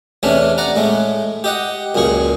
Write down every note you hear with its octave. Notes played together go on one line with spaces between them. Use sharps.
E2 C3 E3 A3 C#4 D4
D5 F#5 A#5
A2 G#3 A3
G4 D#5 F#5
C#2 F#2 A#2 G#4 C#6